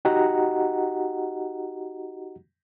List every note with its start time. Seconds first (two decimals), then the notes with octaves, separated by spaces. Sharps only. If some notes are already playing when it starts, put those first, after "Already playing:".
0.05 D#4 F#4 G4 D#5 F#5 A#5